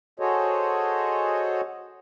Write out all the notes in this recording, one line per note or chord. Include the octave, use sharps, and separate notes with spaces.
F#4 G#4 A4 C5 C#5 D#5